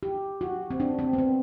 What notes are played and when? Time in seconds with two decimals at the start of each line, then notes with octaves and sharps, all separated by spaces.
0.03 G4
0.41 F#4
0.70 C4
0.80 D4
0.99 C4
1.13 B3
1.18 C4